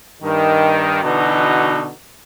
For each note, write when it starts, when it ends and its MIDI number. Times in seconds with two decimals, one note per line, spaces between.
0.23 1.02 43
0.23 1.02 51
1.03 1.89 47
1.03 1.89 50
1.03 1.89 52
1.03 1.89 63
1.03 1.89 66